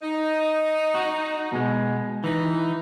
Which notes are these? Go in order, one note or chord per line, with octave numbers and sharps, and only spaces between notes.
D#4
F#4
B2 G#3
E3 D#4